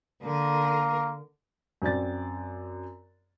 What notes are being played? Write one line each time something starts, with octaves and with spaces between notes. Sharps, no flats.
D3 A#3 A#4
F#2 C4 D5 A6